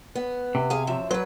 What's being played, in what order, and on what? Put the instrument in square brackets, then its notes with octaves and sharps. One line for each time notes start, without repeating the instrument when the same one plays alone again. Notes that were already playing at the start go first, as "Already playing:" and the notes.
[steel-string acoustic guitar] B3
[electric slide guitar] C3
[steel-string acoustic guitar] G#4 F5
F#2 F3 E5
[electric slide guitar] F#3 [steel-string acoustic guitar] B4 C5